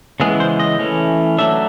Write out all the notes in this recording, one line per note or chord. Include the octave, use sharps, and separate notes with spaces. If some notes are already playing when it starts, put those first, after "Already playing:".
C#3 E3 G#3 B3 G#4
C5
D#5
E3 A3 C#4
F#3 A3 D4 E5